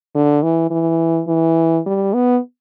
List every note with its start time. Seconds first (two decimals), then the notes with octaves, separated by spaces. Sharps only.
0.15 D3
0.43 E3
0.71 E3
1.28 E3
1.86 G3
2.14 B3